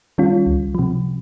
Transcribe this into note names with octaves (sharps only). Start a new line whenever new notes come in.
D#3 G3 C#4 F4
C#2
C3 F3